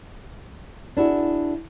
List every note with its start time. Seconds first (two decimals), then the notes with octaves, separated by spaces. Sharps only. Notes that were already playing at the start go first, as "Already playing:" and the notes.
0.97 D4 E4 F#4 G#4